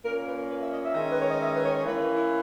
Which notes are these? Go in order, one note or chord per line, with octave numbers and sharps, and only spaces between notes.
A#2 A#3 C#4 A#4
B4
B4
E5
D#5
E5
D#3 G#3 C#4
B4
C#5
D#5
E5
B4
C#5
C#5
E3 A#3 C#4 B4
B4
E4